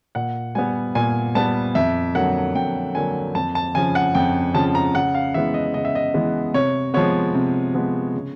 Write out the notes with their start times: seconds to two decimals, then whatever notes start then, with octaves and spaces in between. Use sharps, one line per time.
0.15 A#2 F#5
0.55 G3 B3 G#5
0.95 A#2 G#5
1.35 G3 B3 A5
1.75 F2 E5
2.15 D3 F#3 A#3 F#5
2.55 F2 G5
2.95 D3 F#3 A#3 G#5
3.35 F2 A5
3.55 A5
3.75 C#3 F3 G#5
3.95 F#5
4.15 F2 G5
4.54 C#3 F3 A5
4.75 A#5
4.95 C#3 F#5
5.15 F5
5.34 E3 G#3 B3 E5
5.54 D#5
5.74 C#3 D#5
5.85 E5
5.95 D#5
6.14 E3 G#3 B3
6.54 C3 C#5
6.94 F3 G#3 B3 C#5
7.35 C3
7.74 F3 G#3 B3
8.14 C#3